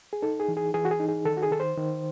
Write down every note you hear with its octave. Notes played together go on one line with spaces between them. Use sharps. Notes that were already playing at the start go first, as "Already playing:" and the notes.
G#4
D#4 A4
G#4
E3
G#4
E3 G#4
F#4
G#4
D#4
G#4
D#3 A4
F#4
G#4
D#3 A4
C5
D#3